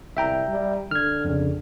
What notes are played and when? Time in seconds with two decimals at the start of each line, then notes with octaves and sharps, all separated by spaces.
0.17 C2 E5 G5 A#5
0.49 G3
0.91 D3 F6 G#6
1.25 F2 C#3